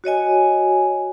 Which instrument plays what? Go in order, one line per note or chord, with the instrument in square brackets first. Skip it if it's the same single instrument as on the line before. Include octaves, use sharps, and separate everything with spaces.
[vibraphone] F#4 C#5 D#5 G#5